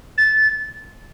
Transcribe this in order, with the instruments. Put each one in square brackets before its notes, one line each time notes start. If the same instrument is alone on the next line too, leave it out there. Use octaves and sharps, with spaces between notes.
[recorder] A6